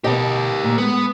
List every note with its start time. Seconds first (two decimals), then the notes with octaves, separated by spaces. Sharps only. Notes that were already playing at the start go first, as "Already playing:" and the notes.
0.04 B2 G4 A#4 D#5
0.64 A#2
0.78 G#3 B3